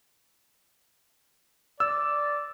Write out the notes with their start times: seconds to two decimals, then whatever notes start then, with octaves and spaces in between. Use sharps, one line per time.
1.80 D5 E6